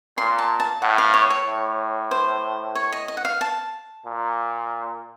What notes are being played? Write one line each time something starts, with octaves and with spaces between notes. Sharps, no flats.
A#2 C6
A5
A5
A2 F#5
F5
C#5
C#5
A2
C5
C#5
D#5
D#5
F#5
F5
A5
A#2